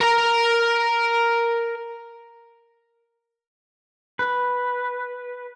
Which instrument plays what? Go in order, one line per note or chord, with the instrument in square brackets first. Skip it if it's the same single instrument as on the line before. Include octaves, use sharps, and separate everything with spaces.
[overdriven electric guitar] A#4 A#5
[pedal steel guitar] B4